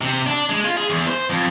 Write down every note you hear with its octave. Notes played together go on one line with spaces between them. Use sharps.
C3
D4
G#3
F4
G#4
E2
C5
F2